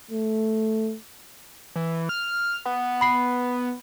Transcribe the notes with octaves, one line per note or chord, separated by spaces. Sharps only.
A3
E3
F6
B3
B5 C7